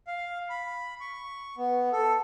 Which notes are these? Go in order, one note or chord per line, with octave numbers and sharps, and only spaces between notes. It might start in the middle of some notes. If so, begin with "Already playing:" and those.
F5
B5
C#6
B3
A4